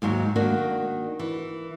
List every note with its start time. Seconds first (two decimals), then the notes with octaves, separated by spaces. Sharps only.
0.02 D#2 G#2 F#3 G#3
0.36 D#3 A#3 D4 F#4
1.19 E3